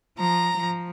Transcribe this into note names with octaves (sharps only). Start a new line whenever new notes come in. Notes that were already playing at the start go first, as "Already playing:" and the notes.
F3 A#5
F3